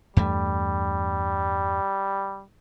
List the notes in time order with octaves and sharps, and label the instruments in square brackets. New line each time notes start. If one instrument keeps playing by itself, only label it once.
[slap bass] E2 G2 A3 [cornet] G3